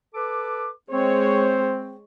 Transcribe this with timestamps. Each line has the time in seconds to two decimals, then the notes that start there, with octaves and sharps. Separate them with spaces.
0.15 A4 B4 D6
0.91 G#3 C4 C5 C#5